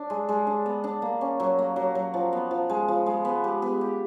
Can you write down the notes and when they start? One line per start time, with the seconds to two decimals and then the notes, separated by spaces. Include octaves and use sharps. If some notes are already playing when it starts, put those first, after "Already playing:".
Already playing: D4
0.10 G#3
0.29 G#3
0.47 D4
0.66 B3
0.84 D4
1.02 A#3
1.21 C#4
1.40 F#3
1.59 A#3
1.76 F#3
1.95 F#3
2.14 F3
2.33 B3
2.51 F3
2.70 G#3
2.88 F3
3.06 G#3
3.25 B3
3.44 G4
3.62 B3
3.81 G4